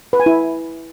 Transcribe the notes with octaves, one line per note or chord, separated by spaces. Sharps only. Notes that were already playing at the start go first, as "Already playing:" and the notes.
B4
G#5
E4